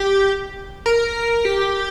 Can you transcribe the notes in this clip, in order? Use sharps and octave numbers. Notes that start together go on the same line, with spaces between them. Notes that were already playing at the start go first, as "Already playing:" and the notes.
Already playing: G4
A#4
G4